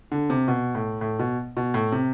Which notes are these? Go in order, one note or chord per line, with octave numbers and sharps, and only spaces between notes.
D3
C3
B2
A2
A2
B2
B2
A2
C3